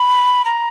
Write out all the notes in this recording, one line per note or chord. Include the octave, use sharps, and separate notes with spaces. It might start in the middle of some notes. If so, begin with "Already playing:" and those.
Already playing: B5
A#5